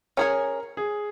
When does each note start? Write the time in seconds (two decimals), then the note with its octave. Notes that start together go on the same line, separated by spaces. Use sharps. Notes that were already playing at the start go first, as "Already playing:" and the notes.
0.17 C#4 G#4 A#4 C#5
0.77 G#4